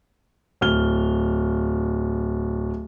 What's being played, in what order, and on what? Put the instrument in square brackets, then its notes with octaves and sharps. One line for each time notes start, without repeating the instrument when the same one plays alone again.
[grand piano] D1 F6 G7